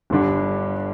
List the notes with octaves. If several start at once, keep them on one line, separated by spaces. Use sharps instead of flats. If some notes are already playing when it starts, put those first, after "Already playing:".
G1 G2 D3 G3 D4